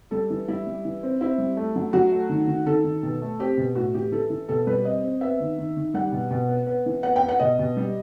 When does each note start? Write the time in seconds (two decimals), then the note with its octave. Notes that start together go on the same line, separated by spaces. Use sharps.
0.11 G3 A4
0.30 E3
0.48 G3 E4
0.67 G3
0.85 E3
1.03 C4
1.21 C4 E4
1.38 G3
1.57 A3
1.76 F#3
1.93 F#3 F#4
2.12 A3
2.29 D#3
2.48 D#3
2.66 D#3 A4
2.84 D#3
3.03 B2
3.22 A3
3.39 C4 G4
3.58 B2
3.75 A2 F#4
3.94 E3 G4
4.12 E3 A4
4.30 E3
4.49 B2 A4
4.67 G3 B4
4.84 C4 D#5
5.03 C4
5.21 B3 E5
5.40 D#3
5.58 D#3
5.77 D#3
5.94 G3 F#5
6.12 B2
6.31 B2
6.49 B3
6.67 B3
6.86 E3
7.03 B3 F#5
7.16 G5
7.22 B3
7.29 F#5
7.40 B2 D#5
7.59 B2
7.77 G3